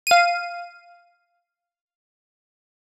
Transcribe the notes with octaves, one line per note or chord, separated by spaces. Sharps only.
F5 D#7